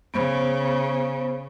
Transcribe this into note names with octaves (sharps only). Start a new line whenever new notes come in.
C#3 B3 C5 B5